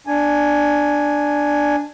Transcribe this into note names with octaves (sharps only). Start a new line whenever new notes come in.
D4 G#5